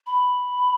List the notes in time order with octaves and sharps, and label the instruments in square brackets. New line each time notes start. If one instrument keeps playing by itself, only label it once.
[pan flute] B5